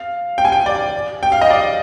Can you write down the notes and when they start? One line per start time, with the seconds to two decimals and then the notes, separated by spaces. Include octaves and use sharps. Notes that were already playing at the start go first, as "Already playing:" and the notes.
Already playing: F5
0.38 G5
0.45 G#5
0.52 G5
0.66 D5
1.23 G5
1.32 F5
1.42 D#5
1.50 D5